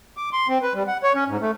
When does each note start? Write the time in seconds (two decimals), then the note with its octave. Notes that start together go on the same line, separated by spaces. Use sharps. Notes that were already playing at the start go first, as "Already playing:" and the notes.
0.17 D6
0.33 C6
0.48 C4
0.62 B4
0.74 G3
0.88 F#5
1.03 C#5
1.15 C#4
1.28 G#2
1.41 A3